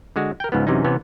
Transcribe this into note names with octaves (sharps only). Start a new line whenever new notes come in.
D3 G#3 F#4
A#4 G5
C#2 G#2 F3 B3
F#2 C3 E3 C#4 D#4
C3 E3 B3 C#4